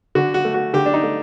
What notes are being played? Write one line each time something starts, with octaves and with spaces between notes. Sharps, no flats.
D3 F#4
F#4
A3
F#4
D3 G4
D4
D#4
A3